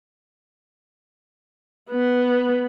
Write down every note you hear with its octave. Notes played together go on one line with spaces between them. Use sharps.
B3